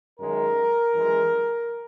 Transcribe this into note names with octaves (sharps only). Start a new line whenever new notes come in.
F#2 D#3 G#3 A#4
F#2 E3 G#3